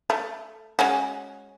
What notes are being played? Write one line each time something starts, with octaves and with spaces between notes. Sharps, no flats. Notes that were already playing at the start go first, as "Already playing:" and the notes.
A3
G#3 C#4 F#4